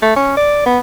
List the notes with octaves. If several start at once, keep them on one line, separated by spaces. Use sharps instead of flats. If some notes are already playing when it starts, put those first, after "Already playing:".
A3
C#4
D5
B3